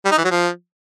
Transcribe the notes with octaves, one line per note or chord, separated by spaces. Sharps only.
G3
D#4
E3
F#3
F3